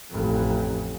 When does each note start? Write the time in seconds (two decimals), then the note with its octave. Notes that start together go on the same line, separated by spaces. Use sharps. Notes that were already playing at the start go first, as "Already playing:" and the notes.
0.10 A1 F2